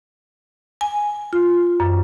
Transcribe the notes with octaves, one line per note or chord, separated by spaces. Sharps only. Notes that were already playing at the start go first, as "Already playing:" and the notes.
G#5
F4
F#2